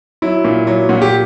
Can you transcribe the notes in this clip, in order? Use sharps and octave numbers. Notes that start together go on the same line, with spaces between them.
F#3 E4
A#2
F#3
A#2 F#4
G4